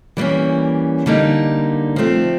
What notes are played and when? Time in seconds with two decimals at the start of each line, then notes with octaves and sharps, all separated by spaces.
0.17 E3 G3 A#3 C#4
1.06 D3 G3 A#3 D#4
1.96 F3 A3 C4